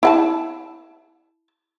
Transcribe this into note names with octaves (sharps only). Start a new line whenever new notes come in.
E4 F#5 A5